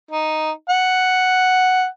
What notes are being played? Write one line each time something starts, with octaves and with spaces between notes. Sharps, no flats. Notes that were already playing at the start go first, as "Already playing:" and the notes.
D#4
F#5